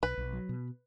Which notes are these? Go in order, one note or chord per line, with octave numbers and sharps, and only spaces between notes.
B1 B4
B1
F#3
B2